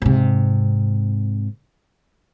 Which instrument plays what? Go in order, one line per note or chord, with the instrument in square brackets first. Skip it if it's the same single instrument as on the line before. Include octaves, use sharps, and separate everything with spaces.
[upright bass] G#2 C3